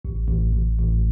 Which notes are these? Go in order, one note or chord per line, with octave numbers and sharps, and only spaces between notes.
A1
A1
A1
A1